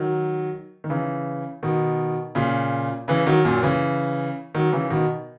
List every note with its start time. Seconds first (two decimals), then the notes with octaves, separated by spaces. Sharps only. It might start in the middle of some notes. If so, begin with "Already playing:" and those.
Already playing: D#3 F#3
0.84 D#3
0.90 C#3 E3
1.63 B2 D#3
2.35 A#2 C#3
3.08 C#3 E3
3.26 D#3 F#3
3.45 F#2 A#2
3.63 C#3 E3
4.55 D#3 F#3
4.72 C#3 E3
4.90 B2 D#3